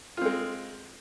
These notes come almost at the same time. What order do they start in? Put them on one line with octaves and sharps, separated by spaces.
F4 C4 G#3